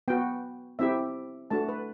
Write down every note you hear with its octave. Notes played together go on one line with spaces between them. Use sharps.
B3 F#4 G5
C4 E4 G4 E5
A3 D4 F#4 A5
B4